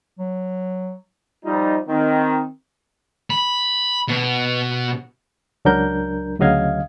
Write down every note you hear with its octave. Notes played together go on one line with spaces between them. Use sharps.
F#3
F3 G3 D#4 F4
D#3 C4
B5
B2
C#2 F#3 D4 A#4 G6
D2 C#3 F#3 D#5 F5 G#6